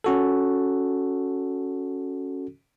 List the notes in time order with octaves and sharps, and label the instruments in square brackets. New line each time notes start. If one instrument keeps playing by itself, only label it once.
[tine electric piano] C#4 F#4 A4